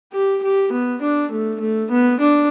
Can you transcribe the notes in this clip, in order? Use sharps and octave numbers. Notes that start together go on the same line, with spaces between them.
G4
G4
B3
D4
A3
A3
B3
D4